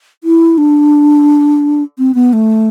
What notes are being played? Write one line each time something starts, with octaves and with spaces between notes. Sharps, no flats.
E4
D4
C4
B3
A3